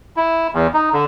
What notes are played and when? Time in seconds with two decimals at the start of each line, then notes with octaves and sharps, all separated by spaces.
0.16 E4
0.54 E2
0.74 D#4
0.93 D3